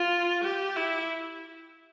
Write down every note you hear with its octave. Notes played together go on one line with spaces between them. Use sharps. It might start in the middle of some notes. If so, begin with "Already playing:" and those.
Already playing: F4
G4
E4